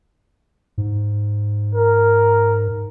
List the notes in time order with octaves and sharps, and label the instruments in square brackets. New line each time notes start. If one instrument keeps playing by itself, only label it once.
[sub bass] G#2
[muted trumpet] A#4